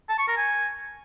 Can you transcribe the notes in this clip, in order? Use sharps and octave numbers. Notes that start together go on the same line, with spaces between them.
A5
C#6
A#4
G#5